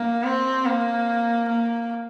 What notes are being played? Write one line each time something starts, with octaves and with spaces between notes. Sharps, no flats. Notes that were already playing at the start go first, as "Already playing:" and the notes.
Already playing: A#3
C4
A#3
A#3